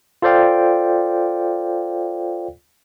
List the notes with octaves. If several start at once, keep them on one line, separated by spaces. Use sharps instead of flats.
F4 A4 C5 D5 F5 G5